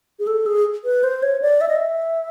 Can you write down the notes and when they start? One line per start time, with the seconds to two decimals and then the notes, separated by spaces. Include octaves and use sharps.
0.19 G#4
0.27 A4
0.46 G#4
0.85 B4
1.04 C5
1.23 C#5
1.42 D5
1.61 E5
1.68 D#5
1.76 E5